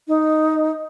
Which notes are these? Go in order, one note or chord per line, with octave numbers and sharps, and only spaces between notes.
D#4